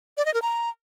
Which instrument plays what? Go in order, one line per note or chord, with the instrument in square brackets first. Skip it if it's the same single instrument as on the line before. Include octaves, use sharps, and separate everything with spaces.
[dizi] D5
D#5
A#4
A#5